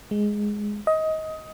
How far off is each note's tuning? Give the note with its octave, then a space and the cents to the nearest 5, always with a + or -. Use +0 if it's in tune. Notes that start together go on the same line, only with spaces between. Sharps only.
G#3 +0
D#5 +20